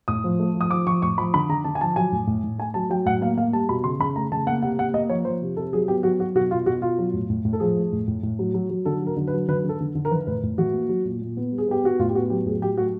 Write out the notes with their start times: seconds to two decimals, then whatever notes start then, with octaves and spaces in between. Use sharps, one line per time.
0.08 A2 D#6
0.24 F3
0.39 A3
0.55 F3
0.61 D#6
0.71 F3 D6
0.87 F3 C#6
1.02 A2 C#6
1.18 F3 B5
1.34 D3 B5
1.49 D3 A#5
1.64 D3 A5
1.75 G#5
1.81 F3 A5
1.96 F#3 G#5
2.12 A2
2.27 A2
2.44 A2
2.58 A3 G#5
2.74 F#3 A5
2.90 F#3 G5
3.06 A2 F#5
3.21 A#3 F5
3.37 A#3 F5
3.53 G3 A5
3.69 B2 B5
3.84 C#3 C6
4.00 C#3 B5
4.16 A3 A#5
4.32 C#3 A5
4.46 A#3 F#5
4.62 C3 F#5
4.78 A#3 F#5
4.94 A#3 D#5
5.09 F3 C#5
5.25 F3 C5
5.42 C3
5.56 C3 A4
5.73 F#3 G#4
5.88 B3 G4
6.03 F#3 F#4
6.19 F#3 F#4
6.35 B2 F#4
6.51 B2 F4
6.66 B2 F#4
6.82 B2 F4
6.98 F#3
7.14 A2
7.30 A2
7.45 A2
7.53 A4
7.60 F3 G#4
7.77 A3
7.92 A2
8.08 A2
8.23 A2
8.39 F#3
8.54 F#3
8.70 F#3
8.85 D3 A4
9.01 F#3
9.07 A#4
9.17 D3
9.27 B4
9.33 F#3
9.48 D3 B4
9.64 D3 A4
9.80 D3
9.95 D3
10.05 A#4
10.11 E3 B4
10.27 A2 B4
10.43 A2
10.58 E3 F#4
10.74 A#3
10.89 F#3
11.05 A#2
11.22 A#2
11.37 B3
11.52 G3
11.58 G#4
11.68 B3 G4
11.84 B3 F#4
11.99 A2 F4
12.09 G4
12.15 B3 F#4
12.30 F#3 G4
12.46 A2 G#4
12.62 F#3 G4
12.78 A3 F#4